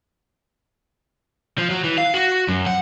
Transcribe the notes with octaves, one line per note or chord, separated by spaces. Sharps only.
F3
F#3
E3
F5
F#4
F#2
F#5